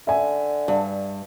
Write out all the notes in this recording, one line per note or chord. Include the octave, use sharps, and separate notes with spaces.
D3 E5 G#5
G2